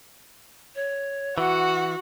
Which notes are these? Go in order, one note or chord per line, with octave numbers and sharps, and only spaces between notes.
C#5
E3 F#4 F#5